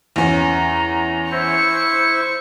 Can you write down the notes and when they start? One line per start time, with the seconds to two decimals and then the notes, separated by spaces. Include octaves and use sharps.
0.16 E2 C#4 A#5
1.32 E4 C5 C#6 C#7